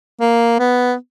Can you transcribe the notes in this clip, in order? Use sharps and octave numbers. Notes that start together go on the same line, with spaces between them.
A#3
B3